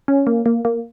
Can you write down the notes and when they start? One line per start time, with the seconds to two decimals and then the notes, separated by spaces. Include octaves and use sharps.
0.08 C#4
0.27 A#3
0.46 A#3
0.65 A#3